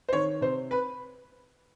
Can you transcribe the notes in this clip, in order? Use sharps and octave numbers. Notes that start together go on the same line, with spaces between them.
C5
D#3 C#5
C3 C5
B4